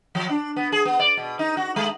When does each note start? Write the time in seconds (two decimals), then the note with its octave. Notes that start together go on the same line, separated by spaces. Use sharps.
0.15 F3
0.29 D4
0.56 B3
0.72 G#4
0.85 B3
1.00 D5
1.17 B2
1.39 D#4
1.57 F#4
1.76 G#3